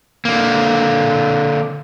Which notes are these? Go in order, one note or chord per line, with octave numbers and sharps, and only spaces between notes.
D3 A#3